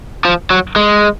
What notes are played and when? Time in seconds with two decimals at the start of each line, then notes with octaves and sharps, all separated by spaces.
0.25 F3
0.50 F#3
0.76 G#3